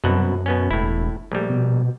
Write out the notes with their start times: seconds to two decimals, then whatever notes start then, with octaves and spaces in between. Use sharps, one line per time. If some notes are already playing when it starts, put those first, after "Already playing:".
0.04 C2 F#2 B2 F#5
0.46 B2 B3 C#4
0.71 E1 A2 E4
1.32 A#1 G3 A3
1.50 B2